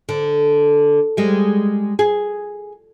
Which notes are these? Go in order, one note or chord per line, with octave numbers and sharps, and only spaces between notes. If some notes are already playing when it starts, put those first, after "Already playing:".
D3
G3 G#3
G#4